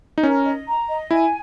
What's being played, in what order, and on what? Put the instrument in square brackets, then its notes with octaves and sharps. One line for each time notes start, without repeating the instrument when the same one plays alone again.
[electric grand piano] D#4
[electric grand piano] C#4 [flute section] A#4
[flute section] D#5
A#5
D#5
[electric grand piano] E4 [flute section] G#5